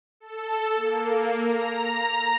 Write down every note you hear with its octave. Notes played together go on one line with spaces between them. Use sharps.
A4
A#3
A#5